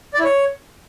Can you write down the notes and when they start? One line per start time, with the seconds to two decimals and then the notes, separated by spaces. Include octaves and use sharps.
0.14 D5
0.19 E4
0.24 C#5